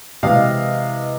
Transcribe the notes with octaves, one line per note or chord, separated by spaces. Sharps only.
C3 E3 G#3 D#5 F5